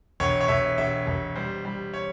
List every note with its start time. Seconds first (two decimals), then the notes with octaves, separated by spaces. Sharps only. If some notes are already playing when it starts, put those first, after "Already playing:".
0.20 E1 C#5
0.41 C#5
0.48 E1 E5
0.78 E1 E5
1.07 E1
1.36 G3 C5
1.65 G3
1.94 C#5